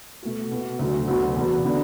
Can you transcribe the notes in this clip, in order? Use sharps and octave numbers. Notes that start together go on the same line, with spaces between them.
B2 A3 F#4
B2 B3 F#4
D2 D3 F#3
D2 D3 F#3 B3 F#4
E2 B2 B3
D3 B3 D4